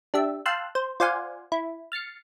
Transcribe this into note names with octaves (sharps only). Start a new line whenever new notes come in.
D4 G4 E5
F5 G5 A5 C6 E6 F#6
C5
F4 C5 D5 F5 F#5 G#5
E4
F6 A6 C7 C#7